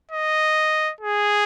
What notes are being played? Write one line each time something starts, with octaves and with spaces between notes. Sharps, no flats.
D#5
G#4